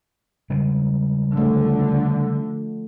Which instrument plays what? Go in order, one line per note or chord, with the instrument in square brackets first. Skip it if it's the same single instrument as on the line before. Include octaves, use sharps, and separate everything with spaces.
[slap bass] C#3 G3 G#3
[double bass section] D3 [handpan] F3 A3